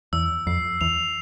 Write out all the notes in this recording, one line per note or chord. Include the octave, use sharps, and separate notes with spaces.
E2 E6
F2 C7
E2 F7